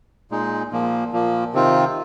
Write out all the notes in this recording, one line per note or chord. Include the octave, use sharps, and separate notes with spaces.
A#2 G#3 D#4
A#2 F3 A#3
A#2 F3 A#3
C3 D#3 C4 F4